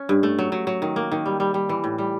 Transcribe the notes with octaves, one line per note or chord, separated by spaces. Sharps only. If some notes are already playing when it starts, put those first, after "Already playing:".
Already playing: C#4
G2
A3
F#3
F#3
F#3
D#3
A#3
D#3
G3
G3
G3
E3
A2
G3